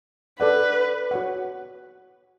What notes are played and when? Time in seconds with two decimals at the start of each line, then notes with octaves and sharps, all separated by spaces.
0.40 A4 B4 D5 F#5
1.11 F#4 C#5 F#5